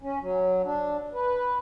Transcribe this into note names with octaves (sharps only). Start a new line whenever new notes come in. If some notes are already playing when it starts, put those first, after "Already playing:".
C#4
F#3
D4
B4